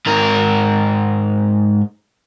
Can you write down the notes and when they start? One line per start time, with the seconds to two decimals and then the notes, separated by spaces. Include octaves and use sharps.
0.06 G#2 A#4